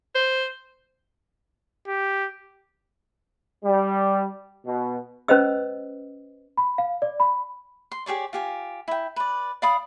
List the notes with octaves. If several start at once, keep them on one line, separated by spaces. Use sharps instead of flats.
C5
G4
G3
B2
C#4 B4 C5 D#5 E6
B5
F5
D5
B5
C6
G4 G#4 C#5 D5
F4 G4 G#5
E4 G5
B4 D5
D5 F5 B5 D#6